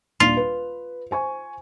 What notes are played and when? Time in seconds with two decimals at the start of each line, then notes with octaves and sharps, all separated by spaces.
0.20 D#1 A#2 D4 F4
0.37 B4
1.11 C5 G#5 C#6